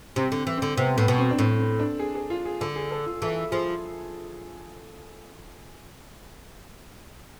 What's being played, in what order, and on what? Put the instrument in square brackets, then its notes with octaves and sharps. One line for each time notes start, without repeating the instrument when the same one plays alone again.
[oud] C3 [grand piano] C4
[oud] D3
E3
[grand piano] C4
[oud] D3
[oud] C3 [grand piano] B3
[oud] A2 [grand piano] B3
[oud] B2
[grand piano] C4
D4
[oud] A2 [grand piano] C4
[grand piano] C4
D4
G#4
G#4
F4
G#4
[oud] D3 [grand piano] A4
[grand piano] G#4
A4
F4
[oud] E3 [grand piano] A4
[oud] F3 [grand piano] G#4